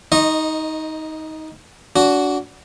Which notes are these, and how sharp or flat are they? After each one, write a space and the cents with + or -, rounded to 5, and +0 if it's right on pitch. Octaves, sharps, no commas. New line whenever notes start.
D#4 +15 D#5 -10 C#6 -30
D4 -30 F#4 +0